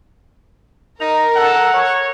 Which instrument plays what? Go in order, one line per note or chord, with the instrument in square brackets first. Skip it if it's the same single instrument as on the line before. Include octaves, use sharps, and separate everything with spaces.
[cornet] D#4 [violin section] A#4 [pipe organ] A#5
[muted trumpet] A4 [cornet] F#5
[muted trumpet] C#5